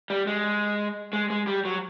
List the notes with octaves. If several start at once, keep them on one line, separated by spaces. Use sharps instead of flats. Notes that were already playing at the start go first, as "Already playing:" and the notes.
G3
G#3
G#3
G#3
G3
F#3